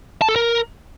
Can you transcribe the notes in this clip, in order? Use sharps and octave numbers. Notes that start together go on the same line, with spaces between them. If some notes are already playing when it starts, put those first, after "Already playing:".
A5
A4
A#4